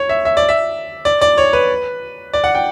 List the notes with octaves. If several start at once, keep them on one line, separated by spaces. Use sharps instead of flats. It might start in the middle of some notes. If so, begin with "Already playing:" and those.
Already playing: C#5
E5
E5
D5
E5
D5
D5
C#5
B4
D5
F#5
G5